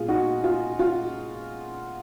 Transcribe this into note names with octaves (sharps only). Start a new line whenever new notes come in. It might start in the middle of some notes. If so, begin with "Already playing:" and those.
Already playing: A#2 G#3 B3 F4 G#4
D#4 F#4
F4
F4